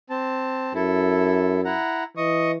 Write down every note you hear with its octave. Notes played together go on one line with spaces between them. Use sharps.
C4 A5
F#2 E4 A4
E4 F#5 A#5
E3 D#5 C#6 D#6